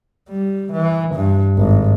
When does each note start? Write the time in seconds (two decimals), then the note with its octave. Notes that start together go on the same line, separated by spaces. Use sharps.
0.29 G3
0.73 E3
1.15 G2
1.58 G#1